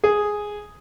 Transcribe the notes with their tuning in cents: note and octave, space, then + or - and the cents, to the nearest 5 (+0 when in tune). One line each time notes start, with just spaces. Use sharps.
G#4 +0